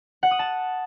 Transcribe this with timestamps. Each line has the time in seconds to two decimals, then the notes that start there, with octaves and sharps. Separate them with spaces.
0.23 F#5
0.31 D#6
0.39 A5